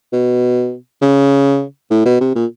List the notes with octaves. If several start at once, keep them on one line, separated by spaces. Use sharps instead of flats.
B2
C#3
A2
B2
C3
A#2